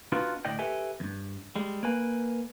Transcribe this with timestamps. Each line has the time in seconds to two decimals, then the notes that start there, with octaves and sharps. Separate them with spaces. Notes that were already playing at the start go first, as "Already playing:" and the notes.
0.12 B3 D4 D#4 F4 F#4 B4
0.45 D2 A2 D5 D#5 G5
0.59 G4 A4 B4 E5 G#5
1.00 E2 G2
1.56 G3 G#3
1.83 A#3 B4 G#5